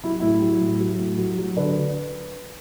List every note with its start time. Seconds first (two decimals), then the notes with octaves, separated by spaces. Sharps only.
0.04 F#3 E4
0.20 A2 E4
0.42 F#3
0.61 A2
0.80 F#3
0.99 A2
1.18 F#3
1.39 F#3
1.57 D3 B4